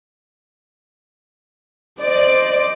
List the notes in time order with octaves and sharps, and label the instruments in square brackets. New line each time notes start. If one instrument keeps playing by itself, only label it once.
[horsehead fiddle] C5 D#5 [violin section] D5